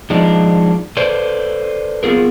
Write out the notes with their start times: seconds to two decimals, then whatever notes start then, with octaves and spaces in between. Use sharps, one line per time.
0.10 F3 G#3 D4 D#4
0.97 A4 B4 C5 D5
2.03 B3 F4 G#4 A#4